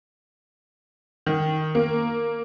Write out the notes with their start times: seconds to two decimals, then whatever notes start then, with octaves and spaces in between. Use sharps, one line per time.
1.26 D#3
1.75 A#3